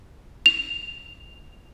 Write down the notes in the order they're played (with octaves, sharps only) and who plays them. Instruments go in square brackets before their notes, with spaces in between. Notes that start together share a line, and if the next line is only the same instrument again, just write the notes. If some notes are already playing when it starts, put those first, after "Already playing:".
[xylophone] F7